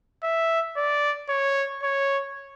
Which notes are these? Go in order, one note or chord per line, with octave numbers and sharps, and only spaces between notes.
E5
D5
C#5
C#5